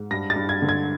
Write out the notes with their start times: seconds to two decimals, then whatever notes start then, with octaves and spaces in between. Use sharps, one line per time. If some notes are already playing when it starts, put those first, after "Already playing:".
Already playing: G#2
0.11 G2 A#6
0.30 A6
0.36 G2
0.49 G#6
0.62 D3
0.69 G#6